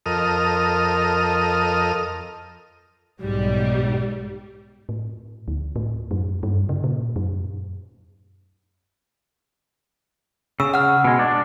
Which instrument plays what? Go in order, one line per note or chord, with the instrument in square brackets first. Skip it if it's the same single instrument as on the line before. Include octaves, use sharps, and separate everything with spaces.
[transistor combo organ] F2 A4 A#4 D#5 D#6 F6
[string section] B1 G#2 G3
[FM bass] A2
D2
A2
F#2
G2
C#3
A#2
F#2
[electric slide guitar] C#3 [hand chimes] E6
[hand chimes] F#5 F6
[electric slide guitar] B2 G#3
D4